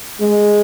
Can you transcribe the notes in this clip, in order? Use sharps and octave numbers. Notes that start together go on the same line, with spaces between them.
G#3